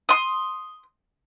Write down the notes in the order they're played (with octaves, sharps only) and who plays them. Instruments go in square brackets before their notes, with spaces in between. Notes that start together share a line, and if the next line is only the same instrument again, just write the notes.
[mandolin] C6 D#6